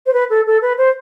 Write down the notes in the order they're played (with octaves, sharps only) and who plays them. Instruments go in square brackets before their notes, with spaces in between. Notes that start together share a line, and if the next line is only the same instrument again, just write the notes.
[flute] C5
B4
A4
A4
B4
C5